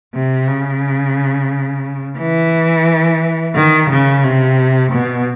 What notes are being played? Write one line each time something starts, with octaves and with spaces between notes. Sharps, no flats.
C3
C#3
E3
D#3
C#3
C3
B2